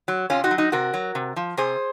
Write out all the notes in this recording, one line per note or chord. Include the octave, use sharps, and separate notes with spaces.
F#3
C3 C#4 F4
D#4 F#4
F#3
D#4 F#4
C3 F#4 A#4
F#3
C3
F3
C3 G#4 C5